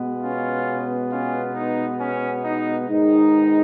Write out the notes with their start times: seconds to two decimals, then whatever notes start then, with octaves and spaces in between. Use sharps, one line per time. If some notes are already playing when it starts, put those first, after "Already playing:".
Already playing: B2 G#3 B3
0.22 C#4 F4
1.11 C#4 F4
1.55 D#4
2.00 C#4
2.44 D#4
2.89 G#2 D#3 G#3 B3 D#4